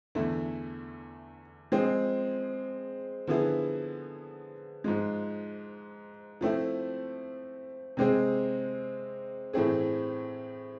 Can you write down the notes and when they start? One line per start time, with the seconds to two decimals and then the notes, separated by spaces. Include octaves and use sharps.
0.15 E2 D3 A3 E4
1.72 F3 G#3 C4 G#4
3.27 D3 F3 B3 E4 G#4
4.84 G#2 F3 G#3
6.41 F3 A3 C4 E4
7.97 C3 G#3 C4 G#4
9.53 A2 E3 A3 C4 G#4